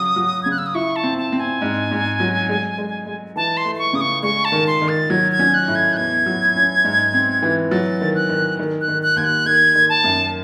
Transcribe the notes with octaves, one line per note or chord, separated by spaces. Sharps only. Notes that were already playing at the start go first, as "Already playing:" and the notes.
Already playing: C#3 F#3 D#6
F#3
G#6
C#3 F#6
E6
D#6
E4 C#6
A5
C4
A5
C4
G#5
G#2
G#2
F#3
G#3
G#3
G#3
E3 A5
C6
A3
C6
C#6
C#3 D#6
C#6
G#3 C#6
A5
D#3
C6
D#3
A6
F#3 G#6
G#6
C#4
F#6
A2
G#6
F#6
E2 G#6
F#3
C#4
G#2
C4
E3
F#3 A6
D#3
F#6
D#3
D#3
F#6
D#3
F#6
D#2 G#6
F#6
D#3 G#6
D#3
A5
F#2